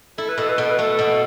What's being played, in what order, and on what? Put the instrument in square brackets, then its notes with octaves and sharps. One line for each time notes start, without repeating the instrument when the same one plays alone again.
[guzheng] E4 [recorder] A4
[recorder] B4
[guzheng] B2 [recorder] A4
[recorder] B4
[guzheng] B2 [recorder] A4
[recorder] B4
[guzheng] A3 [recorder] A4
[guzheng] B2